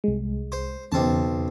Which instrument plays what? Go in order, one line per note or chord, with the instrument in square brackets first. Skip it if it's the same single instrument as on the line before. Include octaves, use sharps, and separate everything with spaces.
[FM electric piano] C2 G#3
[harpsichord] C5
[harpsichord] B1 C4 A5 [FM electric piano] E2 C#3